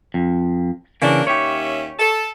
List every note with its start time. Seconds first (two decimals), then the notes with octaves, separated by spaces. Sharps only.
0.14 F2
1.02 C#3 E3 A#3 C#4 D4
1.27 D#2 C#4 G4 C#5 E5
1.99 A4